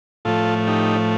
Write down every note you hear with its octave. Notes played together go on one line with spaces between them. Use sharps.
A2 F3 A3 F4 A4
D#4 G4